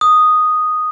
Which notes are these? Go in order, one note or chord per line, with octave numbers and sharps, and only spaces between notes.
D#6